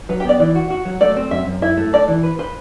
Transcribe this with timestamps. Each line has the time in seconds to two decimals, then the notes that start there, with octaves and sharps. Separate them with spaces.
0.09 F#3 B4
0.20 G4
0.25 B3 D5
0.40 E3 D5
0.55 F#4
0.71 F#4
0.85 F#3
1.01 A3 D5
1.17 C4
1.31 F#2 E5
1.47 F#2
1.62 E4 E5
1.77 A3
1.93 A4 D5
2.08 E3
2.24 B4
2.39 B4 C5